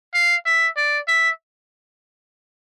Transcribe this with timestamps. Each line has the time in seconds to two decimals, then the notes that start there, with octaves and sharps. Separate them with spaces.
0.14 F5
0.46 E5
0.77 D5
1.08 E5